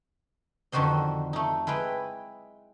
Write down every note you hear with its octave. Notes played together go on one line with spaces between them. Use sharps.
F2 D3 D#3 F#4 C5 D#5
A3 D#4
G#3 E4 B4 G5